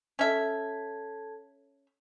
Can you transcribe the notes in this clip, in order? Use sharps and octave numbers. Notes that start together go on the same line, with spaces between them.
C#4 A4 E5 A5 G#6